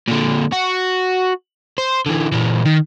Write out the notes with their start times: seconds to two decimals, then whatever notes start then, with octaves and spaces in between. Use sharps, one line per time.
0.08 A#2 D3
0.52 F#4
1.78 C5
2.06 D3 E3
2.32 A#2 E3
2.65 D#3